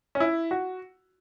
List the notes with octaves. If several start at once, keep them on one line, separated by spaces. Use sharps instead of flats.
C#4
E4
F#4